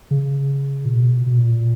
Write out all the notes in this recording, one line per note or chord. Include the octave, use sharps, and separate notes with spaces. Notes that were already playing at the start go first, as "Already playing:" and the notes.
C#3
A#2
B2
B2
A#2